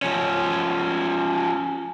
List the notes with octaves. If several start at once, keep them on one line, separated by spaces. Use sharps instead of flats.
F3 C#4